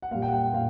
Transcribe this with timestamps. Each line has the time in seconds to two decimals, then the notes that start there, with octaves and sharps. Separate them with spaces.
0.02 F#5
0.11 A#2 G3 F5
0.22 G5
0.28 F#5
0.33 G5
0.53 A#2 F5